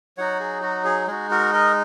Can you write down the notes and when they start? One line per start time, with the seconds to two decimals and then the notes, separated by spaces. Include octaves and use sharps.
0.17 F#3 D#4 F#4 C#5 F#5
0.40 G#4
0.62 F#4
0.85 G#4
1.07 G#3 D#4 F#4 G#4
1.31 F#4 A#4
1.53 A#4 D#5